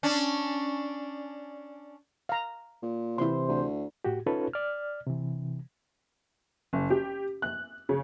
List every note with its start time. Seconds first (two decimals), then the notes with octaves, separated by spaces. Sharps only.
0.03 C#4 D4
2.29 F5 A#5
2.83 A#2
3.18 C3 E3 E4 C5 C6
3.49 D2
4.04 A2 F#4 G4
4.26 C#4 D#4 F4 A4 B4 C#5
4.53 D5 F6
5.07 C3 E3
6.73 F#1
6.90 G4
7.42 F#6
7.89 C#3